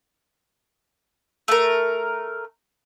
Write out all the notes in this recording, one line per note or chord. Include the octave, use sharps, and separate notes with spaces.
A3 A#4